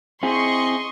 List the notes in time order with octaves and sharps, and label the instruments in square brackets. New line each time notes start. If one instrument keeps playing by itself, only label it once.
[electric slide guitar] C4 E4 G#4 [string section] D#5 C6 C#6